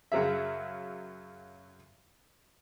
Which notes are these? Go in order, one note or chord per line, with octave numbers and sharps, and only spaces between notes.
F#2 C#3 F#3 G#4 E5